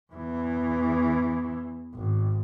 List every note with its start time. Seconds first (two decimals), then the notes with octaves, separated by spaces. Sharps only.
0.13 E2 E3
1.94 G#1